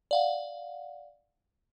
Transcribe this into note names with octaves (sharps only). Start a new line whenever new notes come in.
D5 F5 F#5